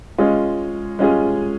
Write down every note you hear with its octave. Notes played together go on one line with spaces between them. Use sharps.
G#3 C#4 F4 G#4
G#3 C#4 F4 G#4